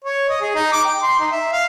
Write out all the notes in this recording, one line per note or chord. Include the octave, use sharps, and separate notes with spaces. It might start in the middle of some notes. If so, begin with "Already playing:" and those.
C#5
D#5
G#4
D#4
D6
G5
C6
D#4
E5
F5